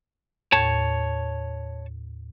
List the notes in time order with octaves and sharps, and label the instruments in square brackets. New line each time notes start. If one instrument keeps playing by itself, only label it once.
[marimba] D#2 A2 G#6 [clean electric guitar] C#5 A5